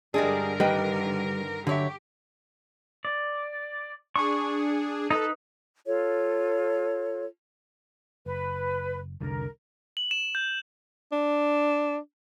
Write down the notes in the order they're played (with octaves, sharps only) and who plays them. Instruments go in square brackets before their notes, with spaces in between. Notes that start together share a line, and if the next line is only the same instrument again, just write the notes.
[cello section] G2 D3 A#4 [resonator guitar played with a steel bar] G3 G#3 G#4 [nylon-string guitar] D4
[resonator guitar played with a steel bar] D#3 [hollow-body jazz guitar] G3 [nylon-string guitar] B4 D#5 G5
[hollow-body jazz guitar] D3 [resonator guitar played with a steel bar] F#3 C#5 E5 [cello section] G4
[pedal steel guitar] D5
[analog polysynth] D4 G#4 [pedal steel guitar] C#6
[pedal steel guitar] D#4 B4 [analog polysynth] A4
[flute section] F4 A4 C#5
[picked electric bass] F#1 [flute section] B4
[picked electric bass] F1 C2 D3 [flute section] A#4
[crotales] F#7
E7
G6
[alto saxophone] D4